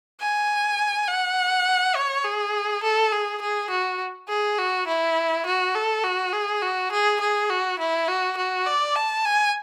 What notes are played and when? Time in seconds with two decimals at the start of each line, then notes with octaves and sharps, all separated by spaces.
0.21 G#5
1.08 F#5
1.96 C#5
2.25 G#4
2.83 A4
3.12 G#4
3.42 G#4
3.71 F#4
4.29 G#4
4.58 F#4
4.87 E4
5.46 F#4
5.75 A4
6.04 F#4
6.33 G#4
6.62 F#4
6.92 G#4
7.21 G#4
7.50 F#4
7.79 E4
8.08 F#4
8.37 F#4
8.66 D5
8.96 A5
9.25 G#5